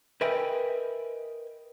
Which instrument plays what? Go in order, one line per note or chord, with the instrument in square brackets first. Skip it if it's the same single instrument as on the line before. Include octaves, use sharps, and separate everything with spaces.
[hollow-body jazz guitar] A#4 B4 D#5 E5 G5 G#5